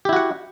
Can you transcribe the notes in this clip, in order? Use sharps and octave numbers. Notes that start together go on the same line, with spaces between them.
E4 F#4 G4 F#5